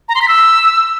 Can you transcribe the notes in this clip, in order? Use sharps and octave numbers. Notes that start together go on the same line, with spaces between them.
A#5
C6
B6
E6